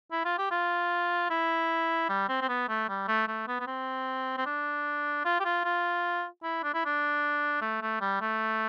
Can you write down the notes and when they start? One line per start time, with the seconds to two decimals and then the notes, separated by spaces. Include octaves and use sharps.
0.12 E4
0.25 F4
0.38 G4
0.52 F4
1.30 E4
2.09 G3
2.29 C4
2.42 C4
2.49 B3
2.69 A3
2.89 G3
3.08 A3
3.28 A3
3.48 B3
3.60 B3
3.67 C4
4.38 C4
4.46 D4
5.25 F4
5.40 G4
5.45 F4
5.65 F4
6.43 E4
6.63 D4
6.74 E4
6.86 D4
7.62 A3
7.82 A3
8.01 G3
8.21 A3